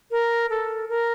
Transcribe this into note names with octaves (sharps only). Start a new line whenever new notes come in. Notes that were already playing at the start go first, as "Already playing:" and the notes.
A#4
A4
A#4